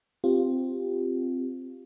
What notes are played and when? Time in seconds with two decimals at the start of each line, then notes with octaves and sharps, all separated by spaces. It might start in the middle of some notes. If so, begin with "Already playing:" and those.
0.24 C4 F4 G4